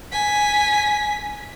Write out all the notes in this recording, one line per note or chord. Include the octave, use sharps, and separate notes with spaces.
G#5 B6